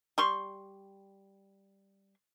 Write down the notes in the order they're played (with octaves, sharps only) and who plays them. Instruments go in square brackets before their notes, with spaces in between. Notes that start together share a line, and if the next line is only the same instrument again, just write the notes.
[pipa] G3 C6 C#6